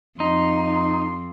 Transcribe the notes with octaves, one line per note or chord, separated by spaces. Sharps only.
F2 D#4 C6